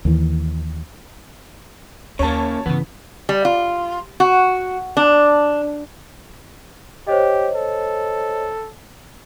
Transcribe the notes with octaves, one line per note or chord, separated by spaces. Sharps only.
D#2 E3
D#2 C#3 A#3 C#5 A5
G2 C#3 E3 B3
G3
F4
F#4
D4
G4 C5 C#5 D#5
A4